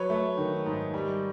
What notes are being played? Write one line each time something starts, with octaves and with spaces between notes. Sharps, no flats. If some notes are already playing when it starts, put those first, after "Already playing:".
Already playing: F#3 B4 C#5
A3
D#3
G#2
G3